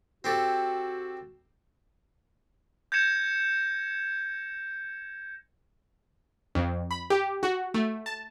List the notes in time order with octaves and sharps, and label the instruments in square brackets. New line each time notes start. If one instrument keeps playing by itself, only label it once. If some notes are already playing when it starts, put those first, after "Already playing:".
[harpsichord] C4 G4 A4 [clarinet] F#4
[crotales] G6 G#6 A#6 C#7 E7
[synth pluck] F2
B5
G4
F#4
A3
A5